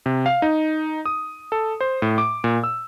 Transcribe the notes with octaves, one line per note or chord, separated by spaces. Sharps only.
C3
F5
D#4
D#6
A4
C5
A2
D6
A#2
E6